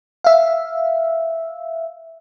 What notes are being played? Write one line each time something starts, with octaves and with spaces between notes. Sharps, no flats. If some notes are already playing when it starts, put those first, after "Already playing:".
E5 F5